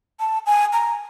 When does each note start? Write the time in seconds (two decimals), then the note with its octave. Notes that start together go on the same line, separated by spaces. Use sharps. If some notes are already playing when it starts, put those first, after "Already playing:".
0.20 A5
0.46 G#5
0.73 A#5